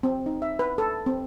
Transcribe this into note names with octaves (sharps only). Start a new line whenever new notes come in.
C4
D#4
E5
B4
A4
C4